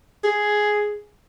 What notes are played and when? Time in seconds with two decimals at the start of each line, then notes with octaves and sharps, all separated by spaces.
0.24 G#4